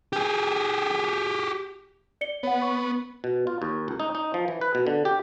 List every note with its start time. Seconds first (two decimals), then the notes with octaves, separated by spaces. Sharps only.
0.13 G4 G#4
2.21 D5 C#7 G7
2.43 B3 C#5 F#5
2.62 C#6
3.24 B2
3.47 F4
3.62 D#2
3.88 C#2
4.00 D#4
4.15 D#4
4.34 F3
4.48 E3
4.61 B4
4.75 B2
4.87 D3
5.05 G4